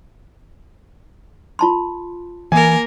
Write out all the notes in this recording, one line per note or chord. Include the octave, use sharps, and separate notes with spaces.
F4 A5 C6
E3 A#3 A#4 G#5